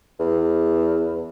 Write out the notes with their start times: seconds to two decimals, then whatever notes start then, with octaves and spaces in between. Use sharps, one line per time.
0.20 E2